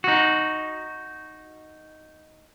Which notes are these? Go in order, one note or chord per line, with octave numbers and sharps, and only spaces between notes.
D#4 F#4